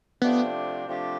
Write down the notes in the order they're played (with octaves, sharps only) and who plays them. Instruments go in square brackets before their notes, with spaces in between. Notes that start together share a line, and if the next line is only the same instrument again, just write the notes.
[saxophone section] C3 F3 A3 D4 G4 [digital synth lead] B3
[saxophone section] C3 F3 A3 D4 G4